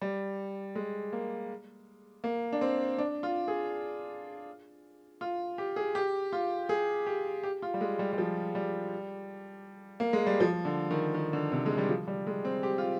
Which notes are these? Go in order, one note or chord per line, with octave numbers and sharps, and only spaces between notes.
G3
G#3
A#3
A#3
D4
C4
D4
F4
G#4
F4
G4
G#4
G4
F4
G#4
G4
G4
F4
G3
G#3
G3
G3
F3
G3
A#3
G#3
G3
F3
D3
D#3
D#3
D3
C3
G#3
G3
F3
G3
G#3
C4
G4
F4